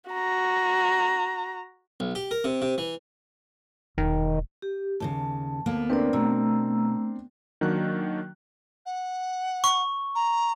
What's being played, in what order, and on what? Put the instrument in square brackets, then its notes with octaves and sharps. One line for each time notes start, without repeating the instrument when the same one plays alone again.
[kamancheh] F#4 A#5
[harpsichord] B1
G4
A#4
C3
C3
E3
[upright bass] E1 [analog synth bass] D#3
[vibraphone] G4
[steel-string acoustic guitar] D#2 A#2 C#3 [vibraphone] A5
[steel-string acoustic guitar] D2 A#3 B3
[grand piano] C4 D4 A#4 [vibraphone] B4 D5
[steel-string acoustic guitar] B2 [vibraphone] A3 A#5 E6
[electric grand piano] D#3 F#3 A#3 D4 F#4 F#6
[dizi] F#5
[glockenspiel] C#6
[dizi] A#5